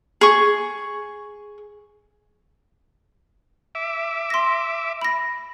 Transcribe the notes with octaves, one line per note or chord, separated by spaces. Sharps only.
G#4 C#6
E5 D6
C6 A#6
B5 A#6